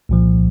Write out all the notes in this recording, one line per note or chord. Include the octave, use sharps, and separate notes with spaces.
C2 A#2 F3